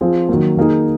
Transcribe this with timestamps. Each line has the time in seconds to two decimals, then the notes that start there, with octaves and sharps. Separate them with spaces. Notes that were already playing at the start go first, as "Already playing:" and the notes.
0.01 F3 C4 F4 G#4
0.29 D#3 F#3 A#3
0.57 D#3 A#3 D#4 G#4